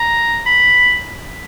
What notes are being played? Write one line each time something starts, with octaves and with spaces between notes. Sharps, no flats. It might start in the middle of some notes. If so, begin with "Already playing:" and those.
Already playing: A#5
B5